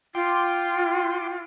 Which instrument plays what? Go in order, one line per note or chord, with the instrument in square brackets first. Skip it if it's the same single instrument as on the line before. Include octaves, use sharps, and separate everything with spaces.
[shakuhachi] F4 [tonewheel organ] G5 C6 D6